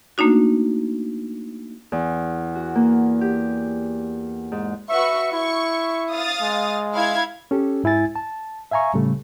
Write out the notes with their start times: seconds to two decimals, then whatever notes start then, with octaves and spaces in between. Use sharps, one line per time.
0.18 A3 A#3 D4 D#4 F#4
1.92 E2
2.55 F#4
2.75 A#3
3.21 G4
4.52 G#2
4.90 F#4 B4 E5 C#6
5.32 E4 C#6
6.11 F5 D#6 A6
6.41 G#3
6.94 E4 F5 G#6
7.51 C#4 G4 A4
7.84 G#2 E4 G#5 A6
8.16 A5
8.71 E5 F5 G#5 A#5 C#6
8.94 A2 C#3 G3 A3